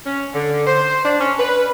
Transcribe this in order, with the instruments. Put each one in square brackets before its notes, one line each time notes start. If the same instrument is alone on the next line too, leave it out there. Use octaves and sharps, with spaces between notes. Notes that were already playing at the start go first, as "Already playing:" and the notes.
[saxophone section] C#4
D3
C5
D4
C#4
B4